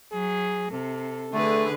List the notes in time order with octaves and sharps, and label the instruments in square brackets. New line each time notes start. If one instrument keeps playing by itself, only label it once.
[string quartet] F#3 [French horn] G#4
[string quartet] C3 [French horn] A4
[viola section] D3 [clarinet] A3 [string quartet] G#4 B4